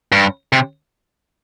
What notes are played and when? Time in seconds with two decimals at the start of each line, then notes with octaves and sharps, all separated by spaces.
0.12 G2
0.53 C3